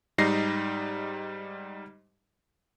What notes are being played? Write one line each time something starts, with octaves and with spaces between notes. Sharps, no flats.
G#2 G3 D#4 A#6 C7